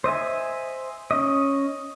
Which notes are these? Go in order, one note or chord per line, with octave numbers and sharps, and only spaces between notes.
C5 D#5 E5 G#5
C#4 D#5